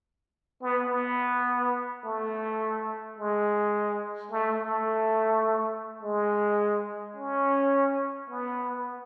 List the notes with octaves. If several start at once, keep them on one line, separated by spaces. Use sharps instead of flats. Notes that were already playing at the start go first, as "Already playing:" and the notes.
B3
B3
A3
G#3
A3
A3
G#3
C#4
B3